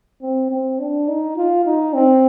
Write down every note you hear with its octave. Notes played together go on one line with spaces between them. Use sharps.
C4
C4
D4
D#4
F4
D#4
C4